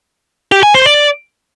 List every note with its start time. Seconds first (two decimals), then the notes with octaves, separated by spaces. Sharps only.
0.52 G4
0.63 G#5
0.74 C5
0.86 D5